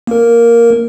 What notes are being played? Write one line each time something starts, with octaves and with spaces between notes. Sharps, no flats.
A#3 A#4